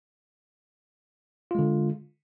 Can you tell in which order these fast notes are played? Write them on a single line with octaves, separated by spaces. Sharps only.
F4 G#3 D3